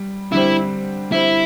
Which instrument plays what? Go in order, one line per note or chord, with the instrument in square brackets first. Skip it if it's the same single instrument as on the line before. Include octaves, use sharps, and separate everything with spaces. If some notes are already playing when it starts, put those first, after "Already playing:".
Already playing: [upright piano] G3
[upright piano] D3 G3 C4 [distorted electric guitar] E4
[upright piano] D3 G3 C4 [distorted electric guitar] E4